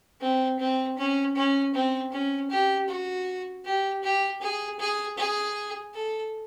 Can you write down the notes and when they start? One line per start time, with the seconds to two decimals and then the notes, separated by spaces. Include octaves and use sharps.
0.21 C4
0.59 C4
0.97 C#4
1.36 C#4
1.74 C4
2.12 C#4
2.50 G4
2.88 F#4
3.65 G4
4.03 G4
4.41 G#4
4.79 G#4
5.18 G#4
5.94 A4